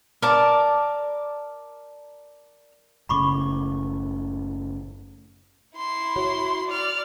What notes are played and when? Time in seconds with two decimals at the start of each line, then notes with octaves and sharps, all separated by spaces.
0.22 A#4 D5 A5
3.09 F#1 A2 C#3 B5 C#6 D6
5.76 E4 C6
6.16 F#4 C#5
6.68 D5 F6